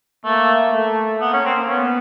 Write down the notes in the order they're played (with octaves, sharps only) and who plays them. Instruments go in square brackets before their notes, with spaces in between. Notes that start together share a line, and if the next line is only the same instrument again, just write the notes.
[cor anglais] A3 [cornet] A#3
[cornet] A3
[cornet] A#3 [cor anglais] B3
[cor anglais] C#4
C4
[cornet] B3 [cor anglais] C#4